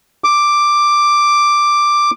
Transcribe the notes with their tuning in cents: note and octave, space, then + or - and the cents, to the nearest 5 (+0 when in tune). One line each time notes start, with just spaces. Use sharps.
D6 +5